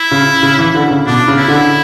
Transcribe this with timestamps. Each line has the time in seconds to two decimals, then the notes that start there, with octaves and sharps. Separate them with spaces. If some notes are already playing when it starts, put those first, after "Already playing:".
Already playing: E4
0.11 C#3
0.43 C#3
0.59 E3
0.75 D3
0.91 C#3
1.06 B2 D4
1.28 C#3
1.38 E4
1.48 D3